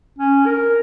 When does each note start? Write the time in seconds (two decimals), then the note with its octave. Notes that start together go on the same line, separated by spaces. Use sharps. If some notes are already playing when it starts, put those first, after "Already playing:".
0.19 C#4
0.46 A#4